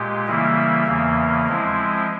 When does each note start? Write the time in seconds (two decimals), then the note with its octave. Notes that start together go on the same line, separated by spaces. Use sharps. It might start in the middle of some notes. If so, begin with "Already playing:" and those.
Already playing: A#2 G#3 G4
0.27 C#3 E3 G3 A#3 E4
0.87 E2 C#3 E3 A#3
1.47 F3 G#3 C4 E4